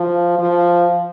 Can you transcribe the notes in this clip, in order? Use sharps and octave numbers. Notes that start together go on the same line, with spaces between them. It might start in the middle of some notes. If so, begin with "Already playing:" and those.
Already playing: F3
F3